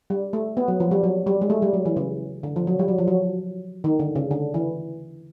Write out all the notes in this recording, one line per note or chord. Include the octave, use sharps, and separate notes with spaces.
G3
A3
B3
F#3
F3
G3
F#3
G3
G#3
A3
G3
F#3
E3
C#3
D3
F3
F#3
G3
F#3
F3
F#3
D#3
D3
C#3
D3
E3